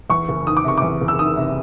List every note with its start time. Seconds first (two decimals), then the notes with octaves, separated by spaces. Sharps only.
0.10 E2 C#6
0.29 F#1
0.47 D#3 D#6
0.57 D6
0.64 C3 C#6
0.78 E2 D6
1.01 F#1
1.08 E6
1.19 D#3 D#6
1.37 C3